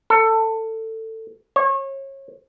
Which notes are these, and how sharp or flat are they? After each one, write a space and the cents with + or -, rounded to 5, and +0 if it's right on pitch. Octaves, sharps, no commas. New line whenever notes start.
A4 +20
C#5 -30